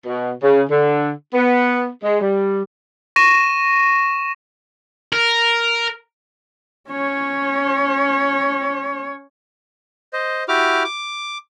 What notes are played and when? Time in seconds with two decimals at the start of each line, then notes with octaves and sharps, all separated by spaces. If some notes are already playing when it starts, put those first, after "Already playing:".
0.05 B2
0.42 C#3
0.70 D3
1.33 B3
2.03 G#3
2.21 G3
3.16 C#6 A#6 D#7 E7
5.12 A#4
6.89 C#4 C#5
10.13 C5 D#5
10.48 E4 F#4 G4 D6 F6
10.84 D6